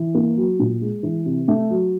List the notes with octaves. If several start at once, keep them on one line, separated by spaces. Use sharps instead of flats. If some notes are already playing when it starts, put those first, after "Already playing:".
Already playing: E3
A#3
F#3
A#2
G#3
E3
C3
A3
F#3